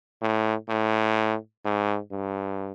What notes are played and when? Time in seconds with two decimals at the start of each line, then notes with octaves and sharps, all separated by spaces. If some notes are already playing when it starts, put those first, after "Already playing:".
0.22 A2
0.69 A2
1.65 G#2
2.12 G2